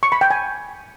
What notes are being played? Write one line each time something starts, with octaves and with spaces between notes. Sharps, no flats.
C#6
B5
G5
G#5